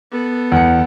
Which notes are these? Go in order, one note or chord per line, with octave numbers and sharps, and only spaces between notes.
B3 A4
E2 C#7